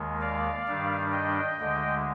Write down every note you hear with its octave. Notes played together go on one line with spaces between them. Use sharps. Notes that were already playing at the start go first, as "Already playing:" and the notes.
Already playing: D#2 D#3 G#3
D5 F5
G2 D#3 G3 D4
D#5 G5
D2 D3 G#3